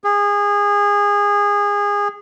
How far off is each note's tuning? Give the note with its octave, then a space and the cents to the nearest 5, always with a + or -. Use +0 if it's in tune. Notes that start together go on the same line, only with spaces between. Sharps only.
G#4 -25